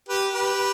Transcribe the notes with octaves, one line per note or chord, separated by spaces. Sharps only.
G4 B4
G4 B4